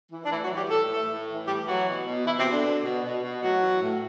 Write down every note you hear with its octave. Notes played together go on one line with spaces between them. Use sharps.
E3
D4
A2 E3 E4
F#3 F#4
E3
G3 G4
A2 A4
E3 A3 A4
A2
E3
A2 G3 G4
E3 F#3 F#4
B2
B2
B2 E3 E4
C3 C4
B2
D3 D4
B2
B2
B2
B2
A2 F#3 F#4
E3
A2